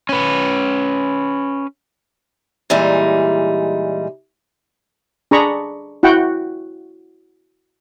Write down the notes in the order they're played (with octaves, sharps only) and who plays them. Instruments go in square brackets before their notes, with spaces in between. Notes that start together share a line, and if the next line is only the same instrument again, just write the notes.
[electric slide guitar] C#4 B4
[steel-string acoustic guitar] A#2 E3 G3 G#3 D#4
[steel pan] D4 G#4 A#5 B5 C#6
E4 F#4 F#5 G5